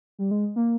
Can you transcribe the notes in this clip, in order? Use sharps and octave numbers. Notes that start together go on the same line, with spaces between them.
G3
G#3
A#3